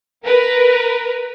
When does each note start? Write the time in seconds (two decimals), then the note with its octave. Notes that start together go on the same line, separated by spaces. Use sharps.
0.24 A#4 B4